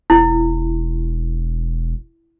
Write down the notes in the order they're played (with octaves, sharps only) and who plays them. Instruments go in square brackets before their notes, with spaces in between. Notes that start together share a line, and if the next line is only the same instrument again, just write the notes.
[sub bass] E1 [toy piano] E4